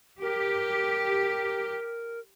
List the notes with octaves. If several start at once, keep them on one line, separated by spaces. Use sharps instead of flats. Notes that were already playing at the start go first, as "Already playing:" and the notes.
G4 A#4